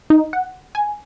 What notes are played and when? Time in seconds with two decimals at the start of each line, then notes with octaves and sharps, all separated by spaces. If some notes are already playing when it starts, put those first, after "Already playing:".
0.10 D#4
0.33 F#5
0.75 G#5